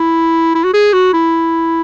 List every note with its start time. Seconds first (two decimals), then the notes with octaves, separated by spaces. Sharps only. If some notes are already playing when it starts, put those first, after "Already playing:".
Already playing: E4
0.55 E4
0.64 F#4
0.74 G#4
0.93 F#4
1.13 E4